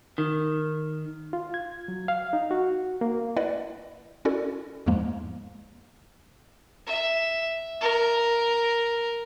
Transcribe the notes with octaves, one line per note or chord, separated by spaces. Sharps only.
D#3
F4
G#6
F#3
F5
D#4
F#4
A#3
E4 B4 D5 D#5 F#5
C#4 E4 F#4 A4 A#4 D5
E2 G#2 F3 G#3 A#3
E5
A#4